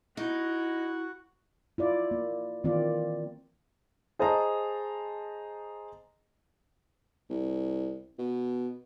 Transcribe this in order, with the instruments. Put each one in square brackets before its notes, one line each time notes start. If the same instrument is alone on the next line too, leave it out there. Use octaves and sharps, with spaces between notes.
[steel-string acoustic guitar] D#4 [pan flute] E4 [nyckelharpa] F#4
[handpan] E4 F4 D5
A#3
D#3 E3 A#3 C4 F4 D5
[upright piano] G#4 C5 D#5 A5 A#5
[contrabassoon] C2
B2